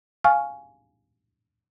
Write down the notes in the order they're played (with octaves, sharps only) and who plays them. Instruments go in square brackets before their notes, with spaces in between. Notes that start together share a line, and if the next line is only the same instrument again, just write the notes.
[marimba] F5 G#5 C#6 F6